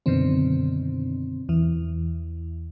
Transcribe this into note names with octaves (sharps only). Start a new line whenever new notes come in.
F#2 B2 D3 D#3 C4
E2 E3